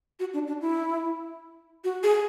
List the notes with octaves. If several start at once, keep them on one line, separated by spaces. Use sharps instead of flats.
F#4
D4
D4
E4
F#4
G#4